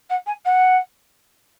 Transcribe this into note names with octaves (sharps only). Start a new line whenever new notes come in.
F#5
G#5
F#5